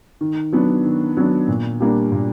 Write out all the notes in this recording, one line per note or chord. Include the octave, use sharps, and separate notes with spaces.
D#3
F#3 B3 D4
D#3
F#3 B3 D4
A#2
G3 A#3 D4
A#2